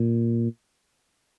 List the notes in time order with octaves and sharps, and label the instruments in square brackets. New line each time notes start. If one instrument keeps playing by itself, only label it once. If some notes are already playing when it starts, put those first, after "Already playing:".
Already playing: [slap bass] A#2